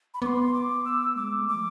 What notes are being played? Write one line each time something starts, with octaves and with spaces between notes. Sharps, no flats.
B5
B3 C6 D6
D6
E6
G#3 D6
A3
D6
F3